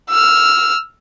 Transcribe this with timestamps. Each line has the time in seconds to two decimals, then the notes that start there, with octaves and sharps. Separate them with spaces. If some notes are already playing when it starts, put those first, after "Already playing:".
0.10 E6 F6